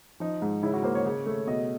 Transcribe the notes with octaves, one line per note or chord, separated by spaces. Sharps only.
F3 D#4
G#2
C#3 E4
F#4
A#3 C5
C#5
C#3
A3
B2 D#5